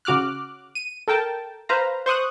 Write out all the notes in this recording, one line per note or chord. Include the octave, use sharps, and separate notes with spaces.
C#3 F#4 D6 F6 F#6
D#7
A4 A#4 G5 A5
B4 C5 F5 A#5
C5 C#6 D#6 F#6